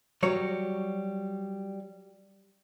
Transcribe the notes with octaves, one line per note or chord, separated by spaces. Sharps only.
F#3 G3 C#5